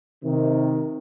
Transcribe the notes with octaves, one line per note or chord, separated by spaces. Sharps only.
C3 D#3